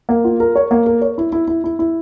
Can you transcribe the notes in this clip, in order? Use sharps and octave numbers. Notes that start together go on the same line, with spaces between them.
A#3
F4
A#4
C#5
A#3
A#4
C#5
E4
E4
E4
E4
E4